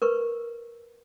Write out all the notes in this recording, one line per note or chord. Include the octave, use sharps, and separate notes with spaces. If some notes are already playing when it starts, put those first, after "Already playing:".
A#4 B4 C#6